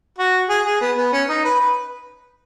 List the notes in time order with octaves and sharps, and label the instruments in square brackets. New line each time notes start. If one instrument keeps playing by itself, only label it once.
[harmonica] F#4
G#4
G#4
B3
B3
C#4
D#4
B4
B4